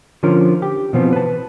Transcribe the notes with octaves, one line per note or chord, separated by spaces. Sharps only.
D3 F3 C#4 F4 A#4
G4
B2 E3 F3 B3 C4
B4 A5